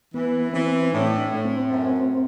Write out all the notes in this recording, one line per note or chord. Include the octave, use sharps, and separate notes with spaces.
E3 B3
E3 C4
A2 D4
A2
C4
F#2